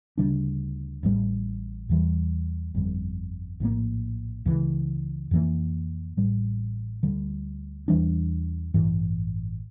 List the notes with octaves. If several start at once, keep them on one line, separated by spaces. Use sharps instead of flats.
D2 C#3 G3 D4
A1 A2 G3
E2 E3 G3
G1 F2 D3 G3
A#1 A2 F3 A#3
C#2 C#3 E3
F2 E3 A#3
A1 A2 G3
D2 D3 G3
E2 E3 G3 D4
A1 G2 E3